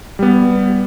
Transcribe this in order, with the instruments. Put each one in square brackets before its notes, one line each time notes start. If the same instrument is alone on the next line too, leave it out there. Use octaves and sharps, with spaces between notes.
[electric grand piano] G3 B3